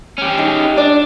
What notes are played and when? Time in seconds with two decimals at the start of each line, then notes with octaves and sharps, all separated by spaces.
0.18 C#4 G4
0.38 D#4 G#4
0.78 D4 D5